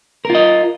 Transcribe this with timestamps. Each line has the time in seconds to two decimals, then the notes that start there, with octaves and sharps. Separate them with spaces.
0.25 A#4
0.30 F4
0.35 D#5